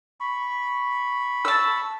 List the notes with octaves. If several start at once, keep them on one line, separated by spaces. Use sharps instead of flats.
B5 C#6
A5 E6